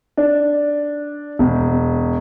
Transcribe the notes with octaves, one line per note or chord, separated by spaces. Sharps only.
D4
E1